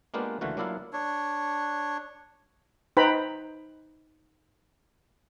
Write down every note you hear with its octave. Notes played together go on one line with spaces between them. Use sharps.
G#3 A#3 B3 D4 F4 G4
C#2 D3 E3 A3 F4 F#4
F#3 A#3 D4 E4 F4 F5
D4 C#5
D#4 B4 C5 G5 A#5 B5